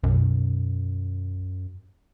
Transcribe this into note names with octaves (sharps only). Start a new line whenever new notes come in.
B1 F#2